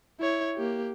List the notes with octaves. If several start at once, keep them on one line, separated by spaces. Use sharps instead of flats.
E4 C#5
A#3 G4